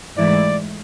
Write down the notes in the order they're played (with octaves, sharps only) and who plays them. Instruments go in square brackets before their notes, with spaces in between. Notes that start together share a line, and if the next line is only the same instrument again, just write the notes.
[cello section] G#2 E3 A3 E4 [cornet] D5